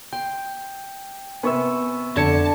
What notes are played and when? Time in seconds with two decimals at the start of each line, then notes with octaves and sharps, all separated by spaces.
0.13 G5 C6
1.43 C3 B3 G#5 C#6 E6
2.16 F2 D3 A5 G#6 C#7